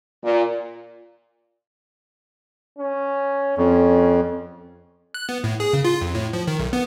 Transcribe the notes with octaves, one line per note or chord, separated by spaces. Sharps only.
A#2
C#4
F2 C#4
F#6
B3
A2
G#4
C#3
F4
F2
A2
F3
D#3
B1
B3